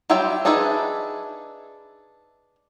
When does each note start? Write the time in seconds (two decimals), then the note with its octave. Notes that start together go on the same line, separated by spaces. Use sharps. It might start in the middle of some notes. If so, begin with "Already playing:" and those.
0.10 F#3 G3 F4 E5 G5
0.45 D4 D#4 G#4 B4 E5